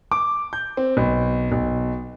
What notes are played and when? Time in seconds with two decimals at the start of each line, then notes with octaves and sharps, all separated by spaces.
0.12 D6
0.53 G6
0.77 C4
0.97 B1
1.52 B1